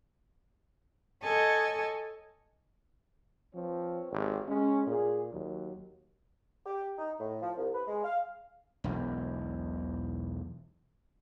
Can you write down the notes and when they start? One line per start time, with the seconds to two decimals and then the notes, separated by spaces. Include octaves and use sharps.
1.22 A4 C#5 D#5 G#5 A5
3.55 F3 C4 B4 C#5
4.12 G#1 C3 G4
4.48 G#3 C#4
4.87 A#2 G#4
5.33 D#2 F#3
6.66 G4
6.98 D#4
7.20 A2
7.42 F3
7.57 C2
7.75 B4
7.88 G#3
8.05 F5
8.84 E1 B1 E2